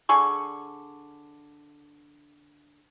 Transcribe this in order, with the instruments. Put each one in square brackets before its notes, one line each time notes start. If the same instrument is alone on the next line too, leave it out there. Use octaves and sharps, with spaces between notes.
[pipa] D3 G#4 C#6